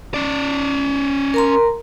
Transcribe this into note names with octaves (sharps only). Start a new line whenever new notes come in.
C#4 D5
A#4 A#5 C6